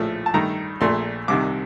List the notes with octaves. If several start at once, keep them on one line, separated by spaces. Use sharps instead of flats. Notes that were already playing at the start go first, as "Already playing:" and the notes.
Already playing: A#1 A2 F3 A3
A5
G2 D#3 A3 A#5
A#1 A#2 A3 C6
C2 C3 D#3 D6